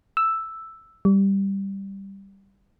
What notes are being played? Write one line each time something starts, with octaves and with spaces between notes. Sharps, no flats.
E6
G3